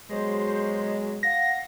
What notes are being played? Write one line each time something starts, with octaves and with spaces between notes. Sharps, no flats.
B2 F#3 G#3 C5 C6
F5 F#5 A#6